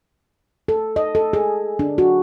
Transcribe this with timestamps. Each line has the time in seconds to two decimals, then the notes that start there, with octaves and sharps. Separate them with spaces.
0.68 A4
0.96 D#5
1.15 A4
1.33 G#4
1.79 D4
1.98 F#4